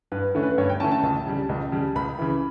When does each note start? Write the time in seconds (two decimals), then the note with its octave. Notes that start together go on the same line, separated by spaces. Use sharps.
0.12 G2 B4
0.35 D3 A3 C#4
0.43 B4
0.58 G2 C#5
0.69 G5
0.80 D3 A3 C#4 A5
0.92 A5
1.03 C#2 A5
1.27 C#3 G3
1.49 C#2
1.72 C#3 G3
1.95 C#2 B5
2.19 C#3 E3